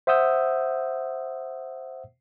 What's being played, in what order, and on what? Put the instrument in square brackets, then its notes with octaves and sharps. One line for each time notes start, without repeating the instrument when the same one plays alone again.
[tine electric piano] C5 E5 F#5 D#6 E6 G6